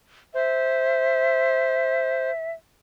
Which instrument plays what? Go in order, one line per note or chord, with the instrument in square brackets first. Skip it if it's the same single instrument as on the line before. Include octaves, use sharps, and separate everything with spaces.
[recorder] C5 [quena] E5